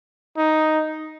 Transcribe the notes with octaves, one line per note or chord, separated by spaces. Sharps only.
D#4